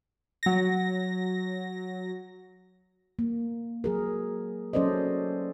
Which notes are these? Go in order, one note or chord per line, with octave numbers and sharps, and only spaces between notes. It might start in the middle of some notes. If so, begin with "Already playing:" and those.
F#3 A#6
A#3
F#3 G#4 A#4
F#3 C#4 A4 C5 D5 D#5